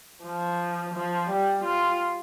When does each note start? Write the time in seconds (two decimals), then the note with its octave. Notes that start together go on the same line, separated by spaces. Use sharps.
0.24 F3
0.94 F3
1.30 G3
1.64 F4